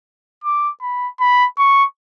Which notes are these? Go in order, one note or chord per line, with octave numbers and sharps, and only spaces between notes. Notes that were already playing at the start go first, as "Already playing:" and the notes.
D6
B5
B5
C#6